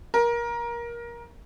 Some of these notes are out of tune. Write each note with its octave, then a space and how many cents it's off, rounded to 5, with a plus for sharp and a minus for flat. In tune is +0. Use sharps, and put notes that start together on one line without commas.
A#4 +20